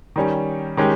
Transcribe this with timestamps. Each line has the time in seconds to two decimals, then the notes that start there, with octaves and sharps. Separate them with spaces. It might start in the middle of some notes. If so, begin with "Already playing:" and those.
0.16 D#3 G3 C#4
0.77 D#3 G#3 C#4 G4